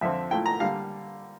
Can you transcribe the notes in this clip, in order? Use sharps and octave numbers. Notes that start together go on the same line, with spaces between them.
F2 D3 F3 C4 E5
A#2 A3 E4 G5
A#5
D3 G3 A#3 F5